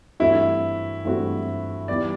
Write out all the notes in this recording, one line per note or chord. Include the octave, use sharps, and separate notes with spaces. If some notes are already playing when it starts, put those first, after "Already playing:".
G2 E3 A3 C4 E4 F#4
G2 E3 A3 C4 F#4
E3 G3 B3 D5